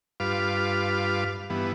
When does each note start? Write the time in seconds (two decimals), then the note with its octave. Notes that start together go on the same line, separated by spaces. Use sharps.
0.20 G2 F4 B4 F5 D6
1.50 G2 E3 B3